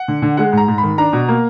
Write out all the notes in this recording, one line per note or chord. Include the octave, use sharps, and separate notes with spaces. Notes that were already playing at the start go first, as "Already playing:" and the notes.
Already playing: F#5
D3
D3
G#3 F#5
G#2 A#5
G#2
B5
D#3
D4 A#5
B2
A#3